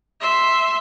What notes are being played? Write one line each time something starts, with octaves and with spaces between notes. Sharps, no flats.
E5 C6